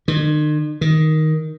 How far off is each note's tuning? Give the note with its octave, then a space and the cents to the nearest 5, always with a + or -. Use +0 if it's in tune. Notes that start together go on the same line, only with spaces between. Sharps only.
D#3 -45
D#3 +5